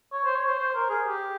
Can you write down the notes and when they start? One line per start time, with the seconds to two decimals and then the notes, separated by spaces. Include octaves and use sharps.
0.12 C#5
0.25 C5
0.36 C#5
0.47 C5
0.60 C5
0.75 A#4
0.90 G#4
1.06 G4